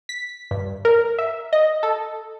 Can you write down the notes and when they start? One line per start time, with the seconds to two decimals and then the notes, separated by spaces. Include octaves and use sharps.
0.09 B6
0.51 G2
0.85 A#4
1.19 E5
1.53 D#5
1.83 A4